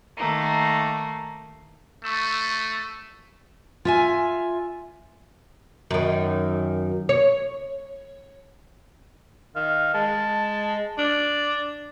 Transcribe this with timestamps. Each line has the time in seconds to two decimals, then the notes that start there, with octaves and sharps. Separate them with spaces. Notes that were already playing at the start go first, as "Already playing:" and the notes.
0.17 D#3 A3 A#3
2.04 A3 C#6 E6 E7
3.85 F4 E5 G#5
5.91 F#2 D#3
7.09 C#5
9.56 D#3 F5
9.94 G#3 A5
10.98 D4 D5